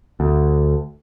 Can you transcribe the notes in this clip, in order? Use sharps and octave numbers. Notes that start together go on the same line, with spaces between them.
D2